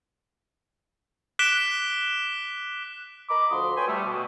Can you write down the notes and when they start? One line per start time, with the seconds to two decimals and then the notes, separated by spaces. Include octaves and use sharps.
1.39 D6 F#6 B6 D7 E7 G7
3.29 D#5 A#5 B5 D6
3.50 D2 F3 F#4 C6 D#6
3.76 B4 C#5 G5 G#5 B5 C6
3.88 G3 A3
4.05 B2